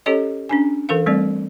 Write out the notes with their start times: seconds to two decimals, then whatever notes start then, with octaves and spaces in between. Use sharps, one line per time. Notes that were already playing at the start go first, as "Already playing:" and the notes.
0.06 C#4 G4 A4 C#5 D#5
0.49 C#4 D4 G#5
0.89 E3 A4 A#4 F5
1.06 G3 A3 C4 D5